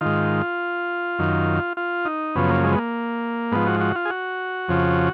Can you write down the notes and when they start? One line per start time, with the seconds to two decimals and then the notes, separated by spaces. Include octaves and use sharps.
0.01 G#2 D#3 F4
1.19 F#2 D#3
1.77 F4
2.05 D#4
2.35 F#2 C#3 F3 B3
2.49 A#3
2.64 G#3
2.72 B3
2.79 A#3
3.52 G#2 F3 B3
3.67 F#4
3.80 F#4
3.95 F4
4.05 G#4
4.10 F#4
4.68 F2 C#3 F3